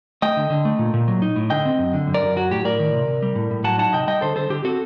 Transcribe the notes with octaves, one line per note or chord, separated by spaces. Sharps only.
A3 D#5 G5
D3
D3
A3
A#2
A#2
F#3
D#4
A2
D3 D#5 G5
C4
F#2
D3
F#2
A#4 D5
F#2
F#3 F#4
A2 G4
A2 A#4 D5
D#3
C3
C3
G3
A2
A2
F#3 F#5 A5
D#4 F#5 A5
C3 D#5 G5
G3 D#5 G5
D3 A4 C5
D3 A4 C5
D3 G4
C4 F#4 A4